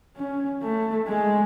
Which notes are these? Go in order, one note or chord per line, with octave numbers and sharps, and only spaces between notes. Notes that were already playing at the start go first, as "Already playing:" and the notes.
C#4
A3
G#3